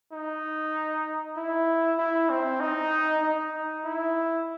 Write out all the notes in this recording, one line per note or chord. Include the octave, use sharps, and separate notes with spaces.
D#4
E4
E4
C4
D#4
D#4
E4